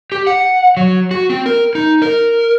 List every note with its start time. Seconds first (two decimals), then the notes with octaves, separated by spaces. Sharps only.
0.12 G4
0.27 F#5
0.77 F#3
1.11 F#4
1.30 C4
1.46 A#4
1.75 D#4
2.02 A#4